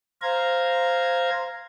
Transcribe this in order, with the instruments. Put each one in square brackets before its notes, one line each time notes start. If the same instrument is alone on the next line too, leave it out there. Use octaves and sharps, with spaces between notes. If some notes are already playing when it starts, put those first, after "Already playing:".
[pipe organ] C5 F5 A#5 G#6